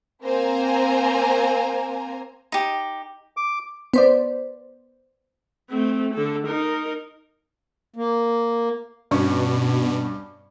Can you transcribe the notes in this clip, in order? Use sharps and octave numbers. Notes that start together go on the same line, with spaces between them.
A#3 C4 C5 G#5 A#5
D#4 G4
D6
B3 C5 D5
A3 C4
D3 A4
D#4 A#4
A#3
G2 B2 C#4 C#6